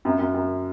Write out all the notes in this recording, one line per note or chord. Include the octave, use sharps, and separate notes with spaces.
F#2
F#2
F#2